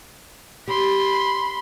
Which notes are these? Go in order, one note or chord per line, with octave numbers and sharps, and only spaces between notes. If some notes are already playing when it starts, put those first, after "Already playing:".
G4 B5 C6